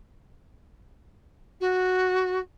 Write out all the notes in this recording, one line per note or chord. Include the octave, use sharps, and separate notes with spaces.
F#4